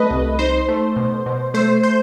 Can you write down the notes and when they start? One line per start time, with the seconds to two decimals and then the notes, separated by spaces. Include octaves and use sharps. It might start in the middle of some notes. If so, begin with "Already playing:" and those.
Already playing: A3 B4 D#5
0.11 C2
0.39 D#4 C5
0.69 A3
0.96 B2
1.26 B2
1.54 A3 C5
1.83 C5